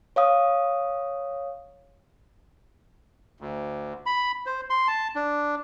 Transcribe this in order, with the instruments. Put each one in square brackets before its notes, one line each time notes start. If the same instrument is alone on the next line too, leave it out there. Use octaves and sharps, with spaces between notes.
[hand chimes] C#5 F5 D#6
[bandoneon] D2
B5
C5
C6
A5
D4